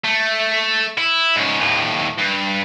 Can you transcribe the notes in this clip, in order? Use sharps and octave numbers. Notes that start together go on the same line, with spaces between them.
A3
E4
G#2 C#4
D#2 A2
G2